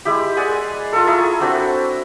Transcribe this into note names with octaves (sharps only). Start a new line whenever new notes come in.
G#3 E4 G4
G#4 D5 F#5 G#5
F4 A4
E4 G#4 A#5 C#6
C4 D4 F#4 A4